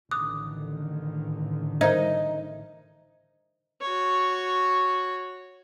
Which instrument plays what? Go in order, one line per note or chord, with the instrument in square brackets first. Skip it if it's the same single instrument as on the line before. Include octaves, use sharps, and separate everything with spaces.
[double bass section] A1 D3 D#3 [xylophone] D6 D#6 F#6
[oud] D#4 [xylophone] A#4 C5 G#6
[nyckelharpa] F#4 C#5